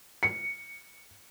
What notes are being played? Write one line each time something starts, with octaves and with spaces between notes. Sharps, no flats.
C#7